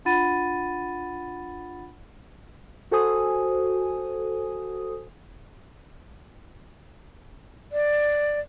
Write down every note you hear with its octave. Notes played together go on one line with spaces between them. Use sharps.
D4 F4 F#5 B5 A6 D#7
F#4 A4 C5 G#5 D#6
D5